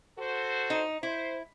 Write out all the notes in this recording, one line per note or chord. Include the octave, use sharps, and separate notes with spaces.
F#4 A4 C5
D#4
E4 C5